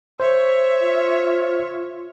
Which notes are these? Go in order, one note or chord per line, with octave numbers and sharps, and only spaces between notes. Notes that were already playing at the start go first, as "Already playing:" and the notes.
C5 C#5 E5
F4